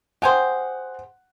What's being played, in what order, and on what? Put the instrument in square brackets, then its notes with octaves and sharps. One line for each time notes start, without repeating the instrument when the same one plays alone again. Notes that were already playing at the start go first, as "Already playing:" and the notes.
[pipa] G4 G#4 C5 [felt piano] F#5